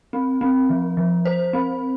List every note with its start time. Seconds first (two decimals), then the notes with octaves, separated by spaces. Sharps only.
0.13 C4
0.41 C4
0.69 F3
0.97 F3
1.25 C5
1.53 C4